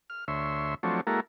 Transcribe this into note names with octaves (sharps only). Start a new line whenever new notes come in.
F6
D2 C#5 E5 C6
F3 F#3 A3 C4 D4 C#5
G#3 A#3 E4 F#4 A4 A#4